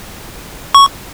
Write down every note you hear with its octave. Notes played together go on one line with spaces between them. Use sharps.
C#6